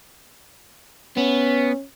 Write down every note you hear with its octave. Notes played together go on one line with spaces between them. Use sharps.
B3 C#4